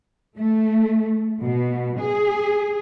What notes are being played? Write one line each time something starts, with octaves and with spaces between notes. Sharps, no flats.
A3
B2
G#4